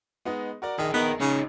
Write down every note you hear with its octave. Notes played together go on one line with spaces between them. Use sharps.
G#3 B3 D#4
F#4 A#4 D5
A#1 D#3 G#4
B3 D#4 A#4
C#3 C#4 D#4